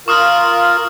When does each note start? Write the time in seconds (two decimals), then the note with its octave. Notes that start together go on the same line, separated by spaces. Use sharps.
0.08 F4 A#4 C#6 D#6 F6